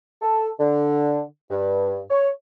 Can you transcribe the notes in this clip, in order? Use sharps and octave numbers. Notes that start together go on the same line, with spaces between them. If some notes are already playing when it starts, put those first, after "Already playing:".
A4
D3
G2
C#5